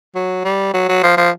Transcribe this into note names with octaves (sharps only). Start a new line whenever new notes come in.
F#3
G3
F#3
F#3
F3
F3